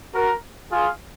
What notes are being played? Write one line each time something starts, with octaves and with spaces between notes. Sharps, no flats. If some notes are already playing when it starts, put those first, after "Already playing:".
F#4 A#4
F4 G#4